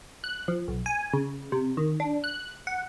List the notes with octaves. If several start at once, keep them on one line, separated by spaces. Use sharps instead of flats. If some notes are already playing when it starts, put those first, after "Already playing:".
F#6
F3
B1
G#5
C#3
C3
D#3
D4
F#6
F#5